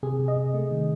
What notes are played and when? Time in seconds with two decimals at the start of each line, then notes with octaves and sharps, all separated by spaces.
0.03 C3 G#4
0.20 C3
0.28 D#5
0.37 C3
0.54 A3
0.71 D#3